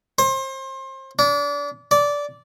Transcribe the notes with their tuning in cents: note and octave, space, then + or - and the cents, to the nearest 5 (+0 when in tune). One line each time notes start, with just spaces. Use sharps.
C5 +30
D4 -30
D5 -15